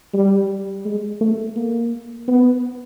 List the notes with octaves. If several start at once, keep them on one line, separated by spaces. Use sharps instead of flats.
G3
G#3
A3
A#3
B3